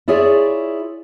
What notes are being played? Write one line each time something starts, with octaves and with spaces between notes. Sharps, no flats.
E4 F4 G#4 C#5 D5 E5